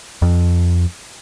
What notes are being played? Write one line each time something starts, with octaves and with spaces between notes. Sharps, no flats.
F2